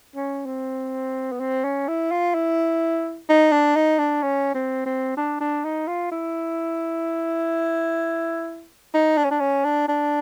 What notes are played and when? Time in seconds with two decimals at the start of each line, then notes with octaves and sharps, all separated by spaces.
0.16 C#4
0.46 C4
1.32 B3
1.40 C4
1.64 C#4
1.88 E4
2.11 F4
2.34 E4
3.29 D#4
3.52 D4
3.76 D#4
3.99 D4
4.22 C#4
4.54 C4
4.85 C4
5.17 D4
5.41 D4
5.64 D#4
5.87 F4
6.12 E4
8.94 D#4
9.17 D4
9.24 C#4
9.31 D4
9.40 C#4
9.64 D4
9.88 D4